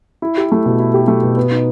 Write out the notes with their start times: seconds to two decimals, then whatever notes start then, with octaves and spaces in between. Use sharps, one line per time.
0.22 E4
0.37 G4
0.52 A3
0.66 B2
0.79 E4
0.94 G4
1.08 A3
1.23 B2
1.37 B3
1.51 D#4